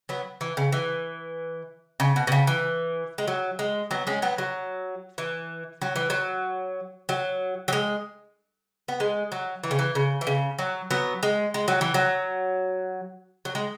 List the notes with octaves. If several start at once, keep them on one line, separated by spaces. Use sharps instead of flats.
F#3 B3
E3
C#3
E3
C#3
B2
B2
C#3
E3
G#3
F#3
G#3
F#3 B3
G#3 C#4
F#3 B3
F#3
E3
F#3
E3
F#3
F#3
F#3
G#3
B3
G#3
F#3
E3
C#3
E3
C#3
E3
C#3
F#3
F#3 B3
G#3
G#3
F#3
E3
F#3
F#3
G#3